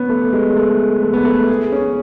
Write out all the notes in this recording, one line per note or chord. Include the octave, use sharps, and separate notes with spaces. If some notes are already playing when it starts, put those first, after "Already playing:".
Already playing: B3 C#4
A3
G#3
A3
A3
B3
A3
G#4
C#4